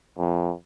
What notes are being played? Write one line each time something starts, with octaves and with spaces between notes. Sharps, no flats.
F2